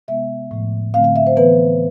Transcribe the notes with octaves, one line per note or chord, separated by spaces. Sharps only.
C3 G#3 B3 E5
A2 F3 A3
D3 A3 C4 F5
F5
E5
C5
E3 B3 B4